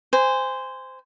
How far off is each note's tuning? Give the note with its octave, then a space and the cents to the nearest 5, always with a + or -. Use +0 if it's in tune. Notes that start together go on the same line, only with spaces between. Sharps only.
C5 -15 G#5 -25